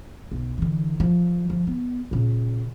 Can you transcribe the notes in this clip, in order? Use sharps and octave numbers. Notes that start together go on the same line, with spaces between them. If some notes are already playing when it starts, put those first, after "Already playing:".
B1
D3 E3
F3
F3
B3
A#2 C#3